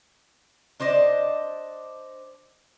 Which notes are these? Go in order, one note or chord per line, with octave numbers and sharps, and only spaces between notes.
D4 C5 D5 D#5